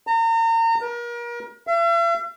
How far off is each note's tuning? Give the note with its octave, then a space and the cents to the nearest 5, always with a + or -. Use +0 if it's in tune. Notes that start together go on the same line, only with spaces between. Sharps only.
A#5 -35
A#4 +35
E5 +45